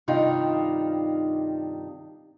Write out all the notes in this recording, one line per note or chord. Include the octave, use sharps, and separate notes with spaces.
G2 C3 D#3 D4 D#4 F4